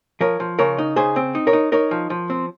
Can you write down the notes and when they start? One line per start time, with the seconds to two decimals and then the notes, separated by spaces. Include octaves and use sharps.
0.21 F3 A#4 C#5
0.40 F3
0.59 C#3 A#4 C#5
0.78 D#4
0.96 C#3 G#4 C5
1.16 C4
1.35 D#4
1.47 A#4 C#5
1.53 D#4
1.72 D#4 A#4 C#5
1.91 F3
2.10 F3
2.30 C4